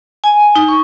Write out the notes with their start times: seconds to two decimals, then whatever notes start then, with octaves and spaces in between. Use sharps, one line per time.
0.24 G#5
0.56 D#4
0.68 C#6